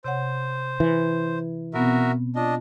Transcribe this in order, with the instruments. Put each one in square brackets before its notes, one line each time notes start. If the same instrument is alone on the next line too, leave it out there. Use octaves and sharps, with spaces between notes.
[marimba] C3 C#5 F#5 [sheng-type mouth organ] C5
[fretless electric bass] E3
[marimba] B2 B3 C4 [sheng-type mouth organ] F#4 A#4 E5
[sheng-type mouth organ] D4 D#5 [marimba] F4